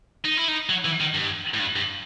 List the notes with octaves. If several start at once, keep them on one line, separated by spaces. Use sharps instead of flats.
D#4
E4
D#4
F#3
E3
D#3
G2
A2
G2
G2